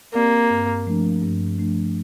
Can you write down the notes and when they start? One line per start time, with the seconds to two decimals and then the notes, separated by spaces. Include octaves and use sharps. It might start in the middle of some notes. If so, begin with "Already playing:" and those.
0.14 A#3 C4 G4 D5
0.50 G2
0.87 F3 A3 D4
1.22 G2
1.59 F3 A3 D4